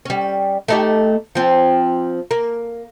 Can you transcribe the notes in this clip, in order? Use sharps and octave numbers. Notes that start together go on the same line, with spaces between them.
G3 C#4
A3 D#4 G4
F3 C4
A#3